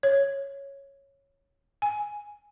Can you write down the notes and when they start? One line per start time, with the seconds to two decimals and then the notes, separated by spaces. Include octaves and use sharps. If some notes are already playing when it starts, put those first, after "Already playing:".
0.03 C#5
1.82 G#5